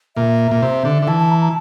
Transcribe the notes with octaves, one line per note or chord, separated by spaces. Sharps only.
A#2 E5
A#2
C3
D3
D3
E3 A5
A5
A#5
A5